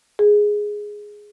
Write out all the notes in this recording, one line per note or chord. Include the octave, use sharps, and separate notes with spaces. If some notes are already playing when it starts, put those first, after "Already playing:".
G#4